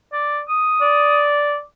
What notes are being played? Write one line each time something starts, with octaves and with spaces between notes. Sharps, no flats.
D5
D#6
D5